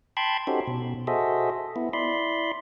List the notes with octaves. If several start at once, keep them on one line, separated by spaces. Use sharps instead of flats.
G5 A5 B5 C6 F#6 G#6
C#4 D#4 F#4 G4 A4 C5
B2
F#4 G#4 A4 C5 D#5 E5
B3 E4
E4 D5 B5 C6